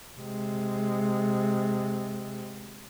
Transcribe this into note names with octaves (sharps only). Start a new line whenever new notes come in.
C3 G#3